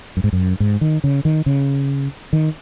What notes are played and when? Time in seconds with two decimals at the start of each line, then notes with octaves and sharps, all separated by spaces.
0.17 F#2
0.24 G#2
0.33 F#2
0.60 G#2
0.81 D#3
1.04 C#3
1.25 D#3
1.46 C#3
2.33 D#3